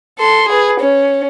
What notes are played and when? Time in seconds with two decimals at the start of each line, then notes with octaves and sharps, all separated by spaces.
0.18 A4 C6
0.48 G#4 B4
0.80 C#4